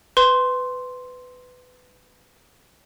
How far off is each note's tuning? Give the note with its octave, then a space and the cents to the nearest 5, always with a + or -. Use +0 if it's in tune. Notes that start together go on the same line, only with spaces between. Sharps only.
B4 +20 C6 +0